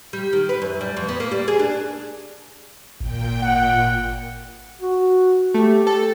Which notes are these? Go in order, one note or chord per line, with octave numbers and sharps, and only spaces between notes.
G3
D#3
B4
F#2
G3
F2
B3
A#3
G3
G#4
D4
G#1 A#2 G5
F#5
F#4
A3 G4
A4